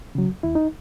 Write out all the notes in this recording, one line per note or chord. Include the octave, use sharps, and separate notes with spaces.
C#3 F#3
D#2 E4
D#4